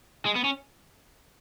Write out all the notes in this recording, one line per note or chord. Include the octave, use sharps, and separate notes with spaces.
G#3
B3
C#4